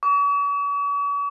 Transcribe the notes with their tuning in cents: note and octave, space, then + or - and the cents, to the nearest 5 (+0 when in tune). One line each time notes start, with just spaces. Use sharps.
C#6 +45